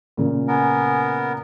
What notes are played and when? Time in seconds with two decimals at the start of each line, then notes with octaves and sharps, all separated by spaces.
0.17 A#2 C#3
0.48 B3 A#4 G#5